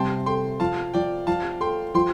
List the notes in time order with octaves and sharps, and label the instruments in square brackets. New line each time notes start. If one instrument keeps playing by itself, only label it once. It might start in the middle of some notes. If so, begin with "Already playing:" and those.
Already playing: [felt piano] C3 G3 [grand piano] G5 A5 C6
[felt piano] A4 [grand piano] G5 C6
[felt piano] F3 [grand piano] F5 A5
[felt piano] F3 [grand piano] D5 G5
[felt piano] F3 [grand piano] F5 A5
[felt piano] A4 [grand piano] G5 C6
[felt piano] F3 [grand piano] G5 C6